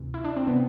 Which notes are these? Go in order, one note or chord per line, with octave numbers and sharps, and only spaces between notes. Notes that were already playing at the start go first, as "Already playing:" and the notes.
Already playing: D2 C3 E3
E4
D4
C4
C3 E3 B3